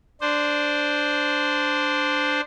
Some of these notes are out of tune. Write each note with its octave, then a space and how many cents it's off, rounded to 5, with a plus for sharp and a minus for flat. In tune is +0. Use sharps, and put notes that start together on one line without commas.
D4 +0 C5 -10